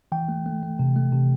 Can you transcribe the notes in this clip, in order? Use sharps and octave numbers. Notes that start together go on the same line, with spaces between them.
E3 G5
A3
A3
A3
C3
A3
C3